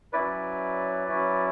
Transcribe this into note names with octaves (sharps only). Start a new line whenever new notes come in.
F#3 C#4 E4 B4 D5
F#3 C#4 E4